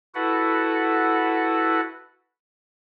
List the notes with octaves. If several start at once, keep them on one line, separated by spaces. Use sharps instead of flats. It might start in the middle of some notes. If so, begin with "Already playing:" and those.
E4 F#4 A4 B4 F#5